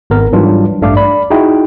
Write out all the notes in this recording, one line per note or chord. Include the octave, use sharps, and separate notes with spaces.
G#1 B3 A#4
G#2 E3 F#3 G3 D4 F4
A1 G2 A3 D4 F5 D6
D5 B5
D#4 E4 F#4 G#4 G5